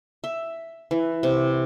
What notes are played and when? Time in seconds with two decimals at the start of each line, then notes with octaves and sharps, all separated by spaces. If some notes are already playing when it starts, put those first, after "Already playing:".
0.24 E5
0.91 E3
1.23 C3